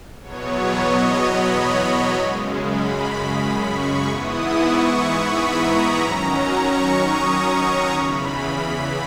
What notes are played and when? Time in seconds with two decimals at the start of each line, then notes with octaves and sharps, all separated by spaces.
0.21 E2 B2 F#3 B3 C#5
0.69 D#5
1.17 B5
2.14 F#2 C#3 G#3
2.62 B5
3.59 C#6
4.06 G#2 E3 B3 E4 D#6
4.54 C#6
5.04 B5
5.51 A#5
5.99 D#3 F#3 C#4 A#5
6.48 C#6
6.96 D#6
7.44 D#6
7.92 E2 C#3 E3 B5